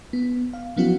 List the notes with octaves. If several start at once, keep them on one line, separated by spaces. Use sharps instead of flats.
B3
F5
F3 F#3 B3 C#4 E4 F#4